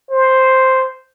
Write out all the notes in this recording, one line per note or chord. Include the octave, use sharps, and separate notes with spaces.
C5